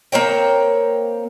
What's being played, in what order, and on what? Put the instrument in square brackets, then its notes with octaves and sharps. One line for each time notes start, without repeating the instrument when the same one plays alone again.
[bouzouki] A#3 C4 C#5 G5